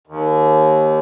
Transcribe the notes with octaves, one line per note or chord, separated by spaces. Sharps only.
D#2